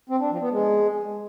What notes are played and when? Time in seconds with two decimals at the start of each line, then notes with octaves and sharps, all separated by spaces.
0.10 C4
0.20 D4
0.31 F3
0.41 B3
0.52 G#3